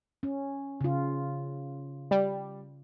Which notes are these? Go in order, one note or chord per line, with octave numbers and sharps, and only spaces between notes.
C#4
C#3 F4
G3